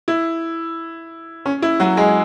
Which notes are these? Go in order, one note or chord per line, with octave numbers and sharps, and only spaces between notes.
E4
C#4
E4
F#3 F#4
G#3 G#4